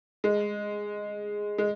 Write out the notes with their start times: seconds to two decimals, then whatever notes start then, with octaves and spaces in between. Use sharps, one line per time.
0.24 G#3
1.58 G#3